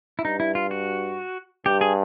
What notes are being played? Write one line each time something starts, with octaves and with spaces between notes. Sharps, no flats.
E4
G2 D#4
E4
F4
F#4
G2 G4
G#4